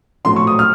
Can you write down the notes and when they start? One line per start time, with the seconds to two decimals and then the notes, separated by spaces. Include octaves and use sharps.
0.25 A#1 A2 F#3 A3 C6
0.36 C#6
0.47 D#6
0.59 F6